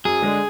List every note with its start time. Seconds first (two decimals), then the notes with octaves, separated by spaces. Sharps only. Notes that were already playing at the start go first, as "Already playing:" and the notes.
0.05 F#2 G#4
0.22 D3 G#3 D4